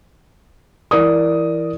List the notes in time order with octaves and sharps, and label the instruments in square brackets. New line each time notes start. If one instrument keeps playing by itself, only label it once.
[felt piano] E3 A#4 D5 D#6